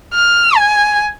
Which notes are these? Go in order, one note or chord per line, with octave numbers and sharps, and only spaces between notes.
F6
G#5